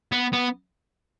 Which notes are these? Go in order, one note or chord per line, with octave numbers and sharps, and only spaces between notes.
B3
B3